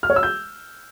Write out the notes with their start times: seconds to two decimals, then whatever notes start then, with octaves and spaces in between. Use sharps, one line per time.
0.03 F6
0.10 C#5
0.16 E6
0.23 G6